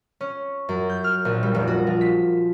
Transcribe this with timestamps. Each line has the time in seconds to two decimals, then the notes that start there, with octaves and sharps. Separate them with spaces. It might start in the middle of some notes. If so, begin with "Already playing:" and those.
0.21 C#4
0.69 F#2
0.89 G6
1.04 F6
1.25 A#1
1.43 G3
1.54 F1
1.67 F#4
1.87 F3
2.01 B6